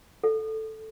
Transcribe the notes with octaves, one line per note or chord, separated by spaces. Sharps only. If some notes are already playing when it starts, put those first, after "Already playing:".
A4